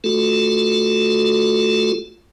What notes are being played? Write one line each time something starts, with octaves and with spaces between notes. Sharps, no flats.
A3 F4 F#4 A4